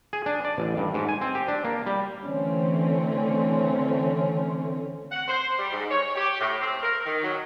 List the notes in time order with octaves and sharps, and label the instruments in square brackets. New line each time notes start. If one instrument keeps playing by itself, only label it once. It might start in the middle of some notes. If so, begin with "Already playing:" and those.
[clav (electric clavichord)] G#4
D4
D5
A1
G2
G#2
G#5
C4
G4
D4
A#3
G3
[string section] D3 E3 A3 C4 C#4
[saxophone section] F#5
C5
G3
G#2
C#5
G4
A2
C4
A#4
D#3
F#3